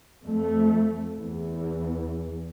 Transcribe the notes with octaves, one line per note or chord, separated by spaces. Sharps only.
F2 A3
E2